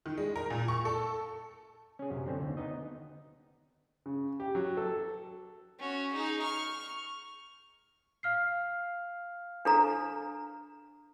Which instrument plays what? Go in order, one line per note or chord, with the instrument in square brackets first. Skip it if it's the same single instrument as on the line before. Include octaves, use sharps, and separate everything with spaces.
[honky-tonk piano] D#3
G#3
A#4
A#2
C#6
A4
[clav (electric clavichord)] C#4 G#4
F#2 C3
D3 C4 C#4
D#2 D3
B3 D#4 D#5
[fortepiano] C#3
G4
F#3
A4
[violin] C#4 F#4
D#4 G#4
C#6 F6
[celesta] F5 F6 C7
[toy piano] D4 A4 A#5